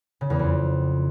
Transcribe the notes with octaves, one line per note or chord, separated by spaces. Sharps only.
C#3
E2
F2